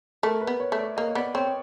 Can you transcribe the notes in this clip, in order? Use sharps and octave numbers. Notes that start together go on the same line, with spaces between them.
A3 A#4
B4
B3
C#5
A3
D5
A#3 D#5
B3 D5
C4 C#5